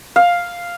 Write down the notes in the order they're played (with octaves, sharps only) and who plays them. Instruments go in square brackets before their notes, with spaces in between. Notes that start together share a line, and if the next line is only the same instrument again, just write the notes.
[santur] F5